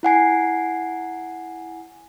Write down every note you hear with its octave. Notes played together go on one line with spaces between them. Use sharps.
E4 F#5 G#5 C7